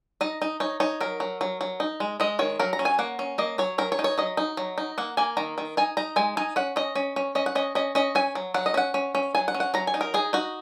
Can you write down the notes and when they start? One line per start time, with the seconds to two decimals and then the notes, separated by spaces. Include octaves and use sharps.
0.21 D#4 D#5
0.42 D#4
0.60 D#4 C#5
0.80 D#4 C#5
1.01 F#3 A#4
1.20 F#3
1.41 F#3
1.61 F#3
1.80 D#4
2.00 G#3
2.20 G#3 D#5
2.39 D#3 C#5
2.59 F#3 A#4
2.73 A#5
2.79 C#4
2.85 G#5
2.99 A#3 F#5
3.19 C#4
3.38 A#3 D#5
3.58 F#3 C#5
3.78 F#3 A#4
3.92 C#5
3.99 D#4
4.04 C#5
4.18 F#3 D#5
4.37 D#4
4.57 F#3
4.78 D#4
4.98 A#3 F#5
5.17 A#3 G#5
5.37 D#3 A#5
5.58 D#3
5.77 D#4 G#5
5.97 D#4 A#5
6.16 G#3 G#5
6.37 D#4 G#5
6.56 C#4 F#5
6.76 C#4 D#5
6.95 C#4
7.16 C#4
7.35 C#4 D#5
7.46 F#5
7.55 C#4 D#5
7.75 C#4 D#5
7.95 C#4 D#5
8.15 C#4 G#5
8.35 F#3
8.54 F#3 F#5
8.66 D#5
8.74 C#4 F#5
8.94 C#4
9.15 C#4
9.35 F#3 G#5
9.48 F#5
9.54 C#4
9.60 F#5
9.74 F#3 A#5
9.87 G#5
9.94 D#4
10.01 A#4
10.14 D#4 G#4
10.33 D#4 F#4